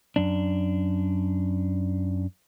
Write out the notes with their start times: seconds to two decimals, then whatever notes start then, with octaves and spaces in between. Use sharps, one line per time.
0.16 F#2 D4